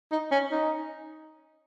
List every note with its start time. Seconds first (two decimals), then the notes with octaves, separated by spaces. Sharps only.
0.12 D#4
0.32 C#4
0.52 D#4